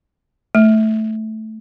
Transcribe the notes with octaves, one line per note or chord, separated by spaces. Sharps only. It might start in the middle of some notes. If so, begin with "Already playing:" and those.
A3